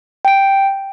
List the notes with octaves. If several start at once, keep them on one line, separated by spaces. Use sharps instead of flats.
G5 D7